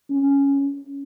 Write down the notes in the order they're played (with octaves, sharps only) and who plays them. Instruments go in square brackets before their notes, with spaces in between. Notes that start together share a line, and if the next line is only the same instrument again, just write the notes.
[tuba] C#4